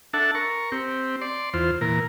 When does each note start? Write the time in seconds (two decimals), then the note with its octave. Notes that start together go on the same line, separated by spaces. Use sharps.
0.14 D4 A4 E5 F#5 A5
0.35 A#4 C#6
0.72 C4 G4
1.21 D5 C6
1.54 E2 F4 C5
1.81 A#2 E3 A#4